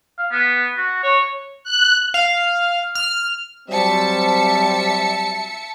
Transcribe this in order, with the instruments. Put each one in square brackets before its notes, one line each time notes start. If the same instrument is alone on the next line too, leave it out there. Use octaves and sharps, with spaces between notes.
[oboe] F5
B3
F#4
C#5
[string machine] F#6
[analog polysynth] F5
F6
[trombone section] F#3 G3 C4 [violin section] E5 A5 C#7